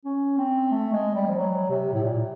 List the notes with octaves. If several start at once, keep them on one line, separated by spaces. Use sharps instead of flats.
C#4
C4
A3
G#3
G3
F3
F#3
C3
A2
A#2